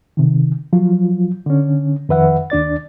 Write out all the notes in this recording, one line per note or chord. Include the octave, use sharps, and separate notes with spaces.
C3 D#3
F3 F#3 F4
D3 C#4
F2 D#3 B4 E5 F#5
D#2 D4 D5 A6